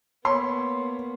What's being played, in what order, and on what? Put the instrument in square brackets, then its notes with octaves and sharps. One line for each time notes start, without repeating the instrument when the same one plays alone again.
[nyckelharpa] A#3 B3 [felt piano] C#5 B5 C6